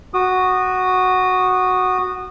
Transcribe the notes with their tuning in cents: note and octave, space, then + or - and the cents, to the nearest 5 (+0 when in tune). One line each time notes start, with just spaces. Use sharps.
F#4 +0 D#6 -25